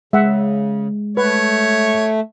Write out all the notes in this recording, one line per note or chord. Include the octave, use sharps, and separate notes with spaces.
C#3 G#3 E5 F#5
A3 B4 C#5